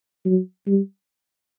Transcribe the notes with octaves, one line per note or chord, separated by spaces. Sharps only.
F#3
G3